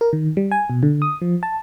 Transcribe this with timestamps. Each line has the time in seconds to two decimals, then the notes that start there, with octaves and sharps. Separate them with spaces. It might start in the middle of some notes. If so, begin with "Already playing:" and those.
0.01 A#4
0.13 D#3
0.37 G3
0.52 G#5
0.70 B2
0.83 D3
1.02 D#6
1.21 F3
1.43 A5